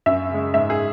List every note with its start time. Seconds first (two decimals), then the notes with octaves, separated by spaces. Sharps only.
0.06 F#2 E5
0.30 C#3 G#3
0.54 G#2 E5
0.70 G#4